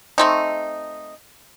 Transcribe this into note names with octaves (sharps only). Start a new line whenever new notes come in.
A3 C4 D#4